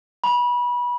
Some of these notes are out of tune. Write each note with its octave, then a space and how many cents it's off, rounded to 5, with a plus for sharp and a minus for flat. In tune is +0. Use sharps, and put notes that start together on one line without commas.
B5 -25